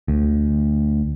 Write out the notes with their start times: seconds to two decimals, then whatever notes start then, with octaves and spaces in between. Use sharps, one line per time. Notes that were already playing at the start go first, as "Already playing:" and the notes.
0.08 D2